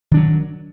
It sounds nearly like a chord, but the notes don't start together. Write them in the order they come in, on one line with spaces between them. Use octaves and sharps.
D#3 D4 F#3